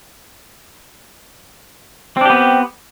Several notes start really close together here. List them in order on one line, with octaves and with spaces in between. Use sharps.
C4 D4 G4 B3